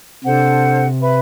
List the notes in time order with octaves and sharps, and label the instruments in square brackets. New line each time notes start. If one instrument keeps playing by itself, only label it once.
[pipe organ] C3 [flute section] D4 A4 C5 F#5
[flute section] B4 E5 B5